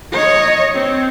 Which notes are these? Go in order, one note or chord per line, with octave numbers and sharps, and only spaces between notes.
C#5 D#5
C4